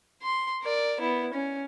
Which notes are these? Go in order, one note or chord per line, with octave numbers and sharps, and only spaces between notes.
C6
A#4 D5
B3 E4
C#4